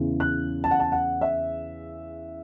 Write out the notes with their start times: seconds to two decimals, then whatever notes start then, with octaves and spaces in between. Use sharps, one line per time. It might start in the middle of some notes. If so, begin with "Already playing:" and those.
Already playing: E2 C#3 E3
0.20 F#6
0.64 A5
0.71 F#5
0.80 A5
0.92 F#5
1.21 E5